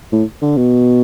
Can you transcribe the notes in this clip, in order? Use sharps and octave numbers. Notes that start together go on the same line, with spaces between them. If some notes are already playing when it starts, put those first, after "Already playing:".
A2
D3
B2